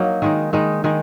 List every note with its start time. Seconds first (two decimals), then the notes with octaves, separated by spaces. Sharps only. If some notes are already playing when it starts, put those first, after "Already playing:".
Already playing: F#3 A#3 D#4
0.22 D#3 G#3 D#4
0.53 D#3 G#3 D#4
0.84 D#3 G#3 D#4